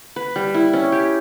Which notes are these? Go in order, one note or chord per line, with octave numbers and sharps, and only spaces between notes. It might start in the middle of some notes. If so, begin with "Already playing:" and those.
B4
G3
E4
C#4
G4